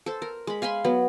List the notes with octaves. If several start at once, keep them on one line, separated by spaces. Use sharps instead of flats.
A4 C5
A#4
G#3 B5
F5 G#5 B5 C6
F#3 B3